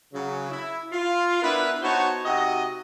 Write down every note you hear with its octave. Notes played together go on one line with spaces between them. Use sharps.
C#3 F#3
E4
F4
B3 D4 E4 A#4 B4
B3 D#4 F#4 C5 C#5 A5
C3 D#4 F#4 D#5